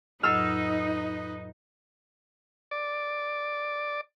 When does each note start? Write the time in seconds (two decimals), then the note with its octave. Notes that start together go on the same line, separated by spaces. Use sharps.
0.23 F2 A2 F#3 D#4 B4 D#5 E6 F6
2.71 D5